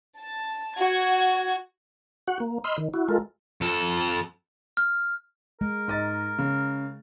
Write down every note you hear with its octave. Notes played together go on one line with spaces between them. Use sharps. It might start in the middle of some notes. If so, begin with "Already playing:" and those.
A5
F#4 G#6
F#4 F#5
A#3
D#5 B5 C6 E6 F6
D#3
E4 F#4
G#3 F4 A4 A#4
F2 A4
F6
G#3 A#4
G#2 D#5 A6
C#3